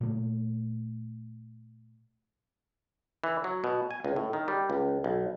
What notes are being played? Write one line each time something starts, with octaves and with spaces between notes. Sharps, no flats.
A#2 A3
E3
F#3
B2
G#5
C#2
A2
D#3
G3
C#2
B1